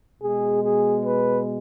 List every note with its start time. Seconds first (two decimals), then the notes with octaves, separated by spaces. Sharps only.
0.22 B2 G#3 G#4
0.63 G#4
1.04 B4